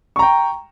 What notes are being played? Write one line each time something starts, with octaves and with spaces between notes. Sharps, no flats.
G5 A#5 C#6